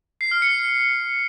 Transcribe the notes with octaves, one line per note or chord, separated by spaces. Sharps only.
C7
F6
C#7